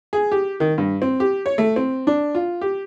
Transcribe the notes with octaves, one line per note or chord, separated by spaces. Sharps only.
G#4
G4
D#3
G2
C4
G4
C#5
A3
C4
D4
F4
G4